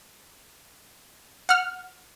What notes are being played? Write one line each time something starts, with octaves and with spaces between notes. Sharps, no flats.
F#5 F6